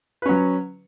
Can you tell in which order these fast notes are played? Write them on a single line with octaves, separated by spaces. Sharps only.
B4 C#4 F#3